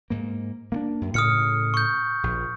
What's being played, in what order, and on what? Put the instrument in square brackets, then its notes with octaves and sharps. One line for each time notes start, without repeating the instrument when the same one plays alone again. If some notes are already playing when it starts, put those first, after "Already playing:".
[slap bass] G#2 A#3
A#3 B3 D4
F#2
[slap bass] A2 C#3 [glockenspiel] D#6 F6 C#7
[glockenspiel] C#6 G6
[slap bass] A#1